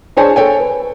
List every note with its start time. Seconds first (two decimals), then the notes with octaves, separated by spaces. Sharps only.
0.17 D4 G#4 C5 C#5 G#5 A5
0.36 A4 C#5 G5 G#5
0.60 B4